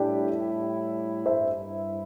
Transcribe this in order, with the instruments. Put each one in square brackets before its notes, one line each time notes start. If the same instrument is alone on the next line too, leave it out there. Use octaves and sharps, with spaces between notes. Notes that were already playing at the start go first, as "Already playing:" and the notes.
Already playing: [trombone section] A2 G3 E4 [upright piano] D4 G4
[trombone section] G2 G3 E4 [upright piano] C5 E5